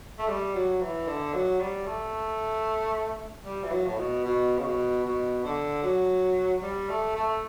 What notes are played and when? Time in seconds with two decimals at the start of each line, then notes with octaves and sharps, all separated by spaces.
0.19 A3
0.28 G3
0.54 F#3
0.81 E3
1.07 D3
1.34 F#3
1.60 G3
1.86 A3
3.45 G3
3.64 E3
3.71 F#3
3.87 A2
3.98 B2
4.25 B2
4.58 C#3
4.64 B2
5.04 B2
5.44 D3
5.83 F#3
6.63 G3
6.89 A3
7.16 A3